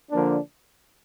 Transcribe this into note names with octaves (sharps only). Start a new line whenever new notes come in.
D3 F3 A#3 D4